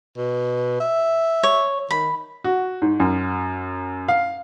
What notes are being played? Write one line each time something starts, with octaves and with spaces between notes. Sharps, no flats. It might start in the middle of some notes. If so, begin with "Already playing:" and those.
B2
E5
C#5
D#3 B5
F#4
G#2
F#2
F5